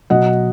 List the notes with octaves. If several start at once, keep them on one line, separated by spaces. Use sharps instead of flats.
B2 F#3 D#5 F#5